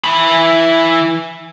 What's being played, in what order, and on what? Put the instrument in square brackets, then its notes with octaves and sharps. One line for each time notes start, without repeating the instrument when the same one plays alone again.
[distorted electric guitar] E3 B5